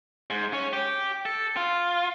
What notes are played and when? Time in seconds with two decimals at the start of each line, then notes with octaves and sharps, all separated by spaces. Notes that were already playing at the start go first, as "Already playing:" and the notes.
0.30 G#2
0.53 C#4
0.73 G4
1.26 A4
1.57 F4